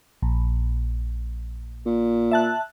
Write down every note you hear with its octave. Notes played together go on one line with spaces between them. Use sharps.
A#1
A#2
E5 A5 F#6